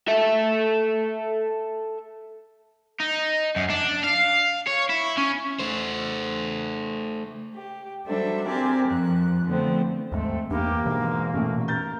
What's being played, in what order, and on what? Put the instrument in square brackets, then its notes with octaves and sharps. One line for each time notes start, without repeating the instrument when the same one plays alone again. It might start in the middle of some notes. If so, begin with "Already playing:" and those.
[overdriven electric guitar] A4 E5
D#4
F#2
D4
F5
C#5
E4
C#4
A3 C5
[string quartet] G4
F#3 G3 D4 A4 C5 E5
C4 G4 A#4 D5 G#5
F2 F3 F#6
D3 F3 A3 B3 C4
[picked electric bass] D#2 G#2 [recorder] A3 [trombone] C4
[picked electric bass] E2 [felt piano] G2 [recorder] A#3 [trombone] G4
[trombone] G#2 [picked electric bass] B2 E3
[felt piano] A1 A#2 [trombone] A3
[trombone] A#4 [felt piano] G6 A6